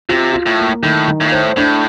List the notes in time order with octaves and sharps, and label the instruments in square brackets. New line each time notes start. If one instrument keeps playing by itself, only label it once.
[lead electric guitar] C3 [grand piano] F4
[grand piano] F4
[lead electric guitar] A2
[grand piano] A#3
[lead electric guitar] A2 [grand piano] D#3
[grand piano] D#3
[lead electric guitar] A2
A#2
[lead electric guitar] A2 [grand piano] C5
[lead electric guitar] A2 [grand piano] D4